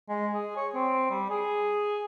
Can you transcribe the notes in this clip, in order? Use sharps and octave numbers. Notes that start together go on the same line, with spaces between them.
G#3
G#4
C#5
C4
G3
G#4